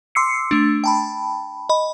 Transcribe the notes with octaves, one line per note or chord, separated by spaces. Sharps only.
C6 D6 E6 C7 C#7
A3 D4
G5 A5 B5
D#5 B5